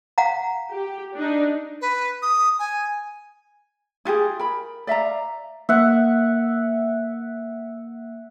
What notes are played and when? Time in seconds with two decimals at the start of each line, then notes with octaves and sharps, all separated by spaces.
0.18 F5 F#5 A#5
0.70 G4
1.15 D4 D#4
1.81 B4
2.22 D#6
2.59 G#5
4.05 E4 F4 G4 G#4
4.39 A#4 B5
4.87 D5 E5 F5 A#5
5.69 A#3 E5 F#5